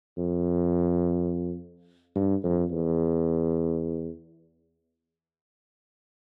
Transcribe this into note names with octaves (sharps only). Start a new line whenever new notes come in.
F2
G2
F2
E2